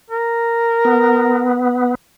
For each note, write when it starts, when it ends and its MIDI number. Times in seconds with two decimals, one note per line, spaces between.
0.10 1.68 70
0.85 1.95 59